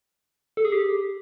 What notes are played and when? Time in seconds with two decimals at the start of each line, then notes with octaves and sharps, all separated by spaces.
0.57 A4
0.65 G#4
0.72 G4